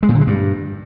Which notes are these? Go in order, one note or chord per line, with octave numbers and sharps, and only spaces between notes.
G#3
A#2
D3
G#3
G2